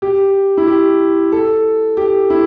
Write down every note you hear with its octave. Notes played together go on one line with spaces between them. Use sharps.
G4
E4
G4
A4
G4
E4